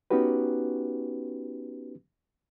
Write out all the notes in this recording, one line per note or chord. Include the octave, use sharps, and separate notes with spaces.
B3 C#4 D#4 F#4 G4 B4